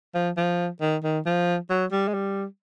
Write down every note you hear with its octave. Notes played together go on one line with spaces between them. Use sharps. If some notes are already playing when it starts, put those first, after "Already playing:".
F3
F3
D#3
D#3
F3
F#3
G3
G#3
G3